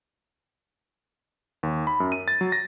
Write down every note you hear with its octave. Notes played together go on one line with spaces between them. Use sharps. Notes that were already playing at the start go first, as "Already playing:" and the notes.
D#2
B5
F#2
D#7
A6
F#3
A#6